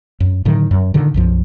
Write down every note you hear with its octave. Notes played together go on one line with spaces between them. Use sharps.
F#2
A2 D3 D#3 F#3
F#2
A#2 D3 D#3
B1 F#2 F3